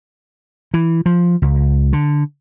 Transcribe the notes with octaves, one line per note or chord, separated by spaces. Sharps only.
E3
F3
C#2
D3